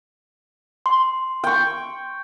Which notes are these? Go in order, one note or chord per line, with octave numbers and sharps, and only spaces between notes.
C6
G5 C#6